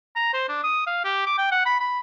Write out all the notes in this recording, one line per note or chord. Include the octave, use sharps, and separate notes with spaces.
A#5
C5
D4
D#6
F5
G4
D6
G5
F#5
B5
B5